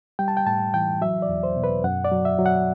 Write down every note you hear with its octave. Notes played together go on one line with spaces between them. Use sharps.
G3 G5
A5
G5
A2 A5
E3 G5
F#3 E5
D5
E2
C5
B2
B4
F#2 F#5
D5
F#3
E5
F#3
F#5